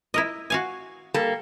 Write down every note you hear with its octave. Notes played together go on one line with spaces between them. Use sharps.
E4 A#4 D#5
F#4 F5 G#5
G3 A#3 A4